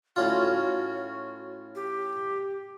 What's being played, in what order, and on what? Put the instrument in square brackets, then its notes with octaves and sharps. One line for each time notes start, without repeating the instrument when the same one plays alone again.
[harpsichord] A2 C#4 F4 [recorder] F#4
[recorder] G4